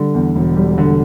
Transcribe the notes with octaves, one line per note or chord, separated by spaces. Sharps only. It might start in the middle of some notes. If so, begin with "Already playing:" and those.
Already playing: D3 G3
E2
E1
G3
D3